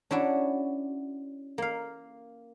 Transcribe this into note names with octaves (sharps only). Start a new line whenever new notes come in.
C#4 D4 E4 F#4
A#3 F5